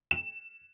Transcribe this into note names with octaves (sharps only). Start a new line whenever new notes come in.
E7